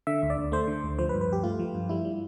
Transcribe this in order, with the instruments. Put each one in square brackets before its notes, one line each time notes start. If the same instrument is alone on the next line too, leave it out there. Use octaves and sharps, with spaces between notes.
[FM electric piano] D3 E5
D2
D5
D2
A3 C5
D3
D2
F3 C5
B4
G2
B4
G2 G4
A3 F4
F3
G2
G3 E4
G3